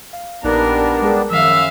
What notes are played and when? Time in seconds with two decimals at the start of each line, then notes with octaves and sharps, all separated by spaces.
0.13 F5
0.44 A#1 G3 B3 D4 D#4 A#4 F#6
1.02 G#3 G#4 A#4
1.31 F#2 D#3 F3 E5 F5